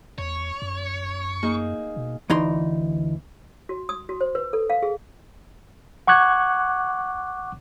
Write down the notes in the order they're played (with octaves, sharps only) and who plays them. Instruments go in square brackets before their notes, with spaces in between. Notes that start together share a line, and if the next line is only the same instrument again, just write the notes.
[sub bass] E2 [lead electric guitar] C#5
[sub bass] F#2
[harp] A#3 D#4 G#4
[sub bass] B2
[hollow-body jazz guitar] D2 E3 D#4 C6
[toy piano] F#4
D#6
F#4
C5
B4
A4
F5
G#4
[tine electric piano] F#5 C#6 D6 F#6 G#6